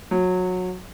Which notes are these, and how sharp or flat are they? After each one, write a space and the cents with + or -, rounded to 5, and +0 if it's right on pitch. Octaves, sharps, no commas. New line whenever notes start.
F#3 -20